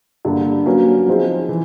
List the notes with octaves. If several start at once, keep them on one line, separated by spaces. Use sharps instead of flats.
G2 D3 G3 A#3 D4
F#3 A#3 C#4 F#4 B4
F3 G#3 C4 D#4 G#4
E3